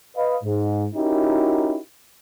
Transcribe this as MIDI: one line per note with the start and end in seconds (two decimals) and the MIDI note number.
0.16 0.37 71
0.16 0.37 75
0.16 0.37 77
0.44 0.85 44
0.95 1.78 61
0.95 1.78 63
0.95 1.78 64
0.95 1.78 66
0.95 1.78 67
0.95 1.78 70